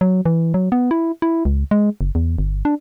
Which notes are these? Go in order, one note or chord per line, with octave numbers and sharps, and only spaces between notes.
F#3
E3
F#3
B3
E4
E4
C#2
G#3
F#1
E2
G1
D4